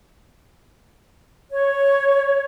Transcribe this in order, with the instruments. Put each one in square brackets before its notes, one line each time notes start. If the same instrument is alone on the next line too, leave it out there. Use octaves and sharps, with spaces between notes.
[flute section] C#5